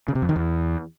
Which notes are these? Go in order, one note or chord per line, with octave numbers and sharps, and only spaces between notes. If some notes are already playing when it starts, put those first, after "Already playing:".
C#3
C3
F2
D#3
E2